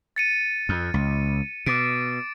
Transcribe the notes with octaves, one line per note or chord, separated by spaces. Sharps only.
A6 C#7 D#7
F2
C#2
B2 D6 A6 D7